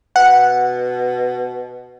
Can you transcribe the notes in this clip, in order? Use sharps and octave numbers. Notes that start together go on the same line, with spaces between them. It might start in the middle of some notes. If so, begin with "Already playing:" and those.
B2 F#5